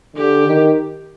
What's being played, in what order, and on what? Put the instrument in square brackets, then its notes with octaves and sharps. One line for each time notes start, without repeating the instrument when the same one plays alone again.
[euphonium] D3 [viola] G4
[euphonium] D#3